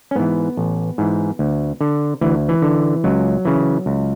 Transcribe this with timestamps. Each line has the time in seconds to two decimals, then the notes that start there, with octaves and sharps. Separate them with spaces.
0.11 C#4
0.15 G#2 E3 B3
0.57 A1
0.98 G#2 E3
1.39 D2
1.81 D3
2.21 D2 E3
2.49 E3
2.62 D3
3.04 C#2 F#3
3.45 C#3 E3
3.86 C#2